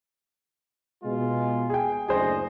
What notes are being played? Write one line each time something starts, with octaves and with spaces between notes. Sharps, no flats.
B2 G#3 F4
G#4 G5
F#1 D2 G#4 C5 D#5